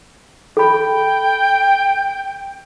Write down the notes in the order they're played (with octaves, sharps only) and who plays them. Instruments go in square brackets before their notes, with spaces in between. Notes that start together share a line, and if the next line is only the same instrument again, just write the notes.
[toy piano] A4 B5 [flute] G5